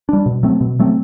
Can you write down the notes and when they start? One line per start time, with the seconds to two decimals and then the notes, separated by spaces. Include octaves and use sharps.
0.09 G3 D4
0.26 B2
0.43 F#3 A3 C4
0.61 B2
0.79 F#3 A3 C4